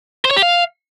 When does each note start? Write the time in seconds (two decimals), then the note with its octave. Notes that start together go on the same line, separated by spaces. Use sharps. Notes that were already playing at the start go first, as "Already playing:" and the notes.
0.25 C5
0.31 C#5
0.37 G4
0.42 F5